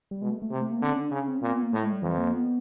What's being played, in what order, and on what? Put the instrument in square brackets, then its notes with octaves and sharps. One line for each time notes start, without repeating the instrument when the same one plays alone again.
[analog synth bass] G3
[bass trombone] B2 [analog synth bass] G#3
[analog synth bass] A3
A3
[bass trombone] C3
[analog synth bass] A3
A#3
[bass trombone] D3 [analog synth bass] C4
[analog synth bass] C#4
D4
[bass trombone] C#3 [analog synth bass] C#4
[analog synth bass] C4
C#4
[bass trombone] A#2 [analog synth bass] C4
[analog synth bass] B3
A#3
[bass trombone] A2 [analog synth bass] A3
[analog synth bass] G#3
G3
[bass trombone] F2 [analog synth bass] E3
[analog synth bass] A#3
B3